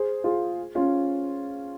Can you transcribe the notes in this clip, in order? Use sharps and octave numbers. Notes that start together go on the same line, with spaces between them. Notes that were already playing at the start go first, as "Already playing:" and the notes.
Already playing: G#4 C5
F4 G#4
C#4 F4